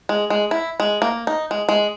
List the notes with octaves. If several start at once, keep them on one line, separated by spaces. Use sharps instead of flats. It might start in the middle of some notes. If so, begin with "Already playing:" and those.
G#3
G#3
E4
G#3
A#3
D#4
G#3
G#3